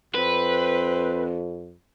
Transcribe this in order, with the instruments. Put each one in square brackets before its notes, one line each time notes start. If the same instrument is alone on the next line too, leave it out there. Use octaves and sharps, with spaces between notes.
[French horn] F2 [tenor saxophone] C4 [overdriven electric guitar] B4